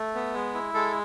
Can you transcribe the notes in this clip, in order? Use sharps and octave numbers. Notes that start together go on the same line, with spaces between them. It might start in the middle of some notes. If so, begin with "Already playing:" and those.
Already playing: A3
B3
G#3
E4
G#3 A4